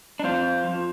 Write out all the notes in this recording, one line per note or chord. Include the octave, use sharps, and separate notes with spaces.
D4
F2 C4 F4
F3